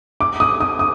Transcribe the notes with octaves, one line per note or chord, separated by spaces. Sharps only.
D6
D#6
D#6
D#6